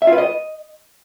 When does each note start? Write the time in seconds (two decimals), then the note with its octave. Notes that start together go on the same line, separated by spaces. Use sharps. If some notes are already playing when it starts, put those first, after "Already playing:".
0.02 E5
0.07 F4
0.13 B4
0.18 D#5